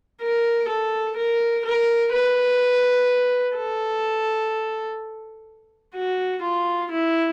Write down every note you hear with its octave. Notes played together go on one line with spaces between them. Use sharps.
A#4
A4
A#4
A#4
B4
A4
F#4
F4
E4